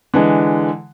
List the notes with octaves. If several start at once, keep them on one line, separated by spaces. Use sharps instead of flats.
D3 E3 G#3